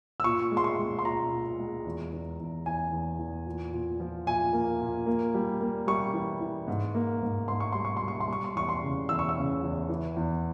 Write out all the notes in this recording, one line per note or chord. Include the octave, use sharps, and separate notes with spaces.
E6
A#2 C#6
G#3
C6
C#6
G#3
C6
A#2 A#5
A#2
G#3
E2
E2
E2
E2 G#5
E2
E2
A#2
A#2
F3
A#2 G#5
A#3
A#2
A#3
G3
A#3
G3 C#6
E3
E3
G#2
A#3
G#2
G#2 C6
C#6
G3 C6
C#6
C6
G3
C#6
C6
G3 C#6
C6
E2 C#6
C6
C#3
E2 E6
C#6
E6
C#3
E2
E3
E2